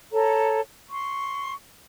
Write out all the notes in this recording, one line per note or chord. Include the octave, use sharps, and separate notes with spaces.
A4 C#5 A#5
C6 C#6